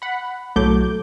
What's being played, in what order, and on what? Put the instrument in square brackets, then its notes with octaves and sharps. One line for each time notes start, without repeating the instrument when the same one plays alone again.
[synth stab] F#5 B5
B1 A2 F#3 A3 D6 G6